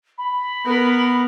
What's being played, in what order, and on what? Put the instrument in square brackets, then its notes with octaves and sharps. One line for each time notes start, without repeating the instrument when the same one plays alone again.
[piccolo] B5
[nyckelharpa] B3 A#4